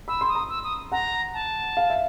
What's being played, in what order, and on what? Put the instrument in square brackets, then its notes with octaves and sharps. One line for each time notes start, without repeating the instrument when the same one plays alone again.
[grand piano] B5 [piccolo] E6
[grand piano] C6
[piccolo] D#6
[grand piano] A#5
[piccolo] E6
D#6
[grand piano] F#5 [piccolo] A#5
[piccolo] A5
[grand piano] F5
E5